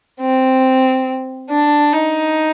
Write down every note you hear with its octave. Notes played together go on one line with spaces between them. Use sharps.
C4
D4
D#4